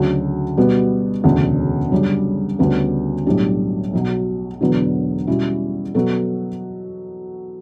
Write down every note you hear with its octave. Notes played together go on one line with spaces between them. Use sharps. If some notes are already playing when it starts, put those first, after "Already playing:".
Already playing: D2 C#3 F#3
B2 G3 B3
E1 D2 C#3
F#2 C#3 G3 D4
D2 C#3 G3 B3
B1 A2 G3 D4 G4
B1 B2 F#3
E1 E2 D3 F#3 B3
B2 G3 C#4 E4
B2 F#3 B3 F#4 A4